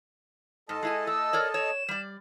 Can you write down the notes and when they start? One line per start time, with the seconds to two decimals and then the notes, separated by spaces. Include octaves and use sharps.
0.69 G#2 A4 D#5 A5
0.83 G#3 E4 G#5
1.07 A3 E6
1.33 A#4 C#5 D5
1.54 C#5 E7
1.88 G3 D5